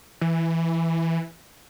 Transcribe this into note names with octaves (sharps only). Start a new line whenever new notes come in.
E3